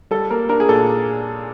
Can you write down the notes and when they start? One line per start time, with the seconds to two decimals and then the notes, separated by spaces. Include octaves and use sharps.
0.11 G3 A4
0.30 A#3 A#4
0.49 D4 A#4
0.60 G#4
0.69 A#2 A4